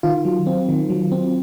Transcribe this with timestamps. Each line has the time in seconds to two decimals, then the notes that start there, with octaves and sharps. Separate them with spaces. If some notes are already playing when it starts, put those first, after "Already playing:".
0.03 D#3 F4
0.25 F#3
0.46 C4
0.69 D#3
0.90 F#3
1.12 C4